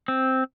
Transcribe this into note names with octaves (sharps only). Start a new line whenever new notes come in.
C4